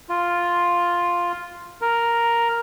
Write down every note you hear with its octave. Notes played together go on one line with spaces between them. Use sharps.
F4
A#4